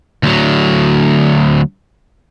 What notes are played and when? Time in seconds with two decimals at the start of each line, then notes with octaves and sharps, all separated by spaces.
0.23 D2 F#3